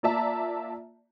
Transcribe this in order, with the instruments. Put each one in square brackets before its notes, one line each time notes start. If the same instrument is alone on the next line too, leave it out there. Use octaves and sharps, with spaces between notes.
[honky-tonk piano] A#3 F4 D5 E5 A5 A#5